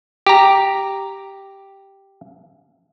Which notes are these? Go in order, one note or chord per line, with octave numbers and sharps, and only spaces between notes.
G4 A#5